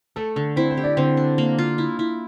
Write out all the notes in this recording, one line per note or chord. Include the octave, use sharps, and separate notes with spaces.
A3 A4
D3 A4
C4 E4 C5
C4 C5
G4
D4 D5
D3 C4 C5
D4
A#3
F4
E4
E4